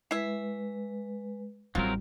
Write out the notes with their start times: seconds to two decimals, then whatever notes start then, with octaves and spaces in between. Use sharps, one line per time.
0.11 G#3 E4 B4 E5
1.75 A1 F#3 G3 C4 F4 A#4